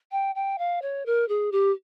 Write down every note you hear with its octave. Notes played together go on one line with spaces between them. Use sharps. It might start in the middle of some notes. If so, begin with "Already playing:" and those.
G5
G5
F5
C#5
A#4
G#4
G4